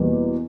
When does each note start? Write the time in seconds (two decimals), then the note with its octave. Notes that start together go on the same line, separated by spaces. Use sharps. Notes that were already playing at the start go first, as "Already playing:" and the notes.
Already playing: E2 B2 G3 A#3